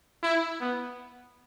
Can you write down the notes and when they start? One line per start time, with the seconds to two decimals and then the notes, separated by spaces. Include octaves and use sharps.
0.23 E4
0.61 B3